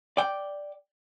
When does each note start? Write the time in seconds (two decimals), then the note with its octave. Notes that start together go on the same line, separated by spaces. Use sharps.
0.17 D5 G5